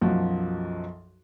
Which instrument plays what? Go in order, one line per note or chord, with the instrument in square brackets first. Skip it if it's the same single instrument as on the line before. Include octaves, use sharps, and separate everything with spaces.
[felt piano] B1 F#2 F3 F#4